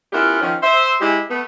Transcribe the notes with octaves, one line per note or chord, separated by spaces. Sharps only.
B3 C#4 E4 F4 G4 A#4
D#3 F3 C#4
C5 E5
G#3 E4 G4
A3 B3